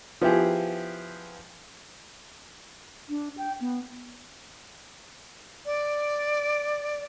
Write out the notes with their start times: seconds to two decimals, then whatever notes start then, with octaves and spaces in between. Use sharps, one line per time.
0.21 F3 B3 E4 G4 G#4
3.09 D4
3.37 G5
3.61 B3
5.66 D5